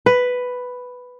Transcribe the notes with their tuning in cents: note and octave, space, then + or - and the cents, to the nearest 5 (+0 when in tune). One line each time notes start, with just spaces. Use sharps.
B4 +5